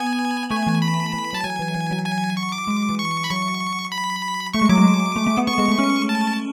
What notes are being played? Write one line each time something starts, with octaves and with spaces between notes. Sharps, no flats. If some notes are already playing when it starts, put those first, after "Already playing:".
Already playing: B3 G#5
A3 G#5
E3
B5
E3
F#3 A5
F#3 G#5
E3
E3
F#3
G#5
C#6
D6
G#3
E3
C#6
B5
F#3 C#6
B5
A3 C#6
G#3
F#3 D6
G#3
A3
A3
B3
B3 C#6
G#3
A3
C#4
A5